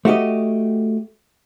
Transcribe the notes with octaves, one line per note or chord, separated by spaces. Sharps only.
A3 F#4 G4 D#5